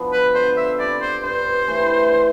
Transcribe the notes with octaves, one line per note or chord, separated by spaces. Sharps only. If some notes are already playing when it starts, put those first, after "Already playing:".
Already playing: F3 B3 D4
B4
D3 C5
E5
G3 C4 D5
C5
G2 C5
E3 A3
D3